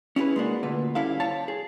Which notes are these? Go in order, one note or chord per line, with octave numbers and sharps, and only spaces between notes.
C#4 E4 F#4 G#4 B4
G#3 A#3 D4 F#4
D2 A#2 B4
G3 C#4 E4 A4 F5
C5 C#5 A5
G#4